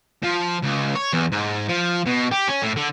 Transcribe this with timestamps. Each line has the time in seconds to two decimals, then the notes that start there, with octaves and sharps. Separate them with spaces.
0.24 F3
0.63 C#2
0.95 C#5
1.13 E2
1.32 G#2
1.69 F3
2.06 B2
2.32 G4
2.48 C#4
2.62 A2
2.77 D3